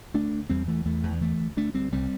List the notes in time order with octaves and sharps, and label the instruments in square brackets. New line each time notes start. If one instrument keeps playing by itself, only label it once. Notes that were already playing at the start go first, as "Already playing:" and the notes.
[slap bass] D2 A3 D4
D2
E2 G3 C4
E2 E3 A3
E2 E3 A3
E2
D2 E3 A3
D2
D2 A3 D4
D2 G3 C4
C2 G3 C4